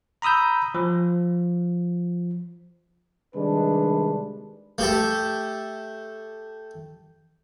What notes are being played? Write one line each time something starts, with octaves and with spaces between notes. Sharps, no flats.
A#5 B5 D#6 E6 G6
F3
C3 D#3 G3 G#3 D4 B4
A3 G4 A4